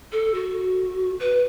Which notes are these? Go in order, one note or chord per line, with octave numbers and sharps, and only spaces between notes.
A4
F#4
B4